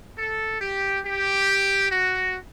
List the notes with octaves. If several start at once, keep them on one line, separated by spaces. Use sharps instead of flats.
A4
G4
G4
F#4